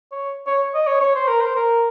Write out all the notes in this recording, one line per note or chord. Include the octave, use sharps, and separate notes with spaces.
C#5
C#5
D#5
C#5
C#5
C5
A#4
C5
A#4